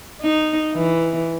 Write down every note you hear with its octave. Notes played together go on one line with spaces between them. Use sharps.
D#4
E3